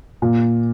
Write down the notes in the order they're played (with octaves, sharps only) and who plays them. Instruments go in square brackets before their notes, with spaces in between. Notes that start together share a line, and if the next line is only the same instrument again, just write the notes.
[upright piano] A#2